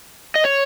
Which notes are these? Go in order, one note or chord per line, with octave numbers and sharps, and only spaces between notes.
D#5
C#5